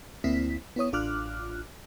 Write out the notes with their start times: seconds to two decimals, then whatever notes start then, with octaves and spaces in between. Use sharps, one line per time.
0.24 D2 A#3 C4 E4 B6
0.76 B3 E4 C#5 D#6
0.93 A1 D4 F4 D6 F6 F#6